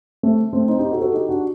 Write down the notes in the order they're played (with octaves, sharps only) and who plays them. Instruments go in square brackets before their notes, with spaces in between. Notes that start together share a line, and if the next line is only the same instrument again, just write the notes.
[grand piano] A3 C4
A3 C4
C4 D#4
D#4 G4
F#4 A4
F#4 A4
D#4 G4
D4 F#4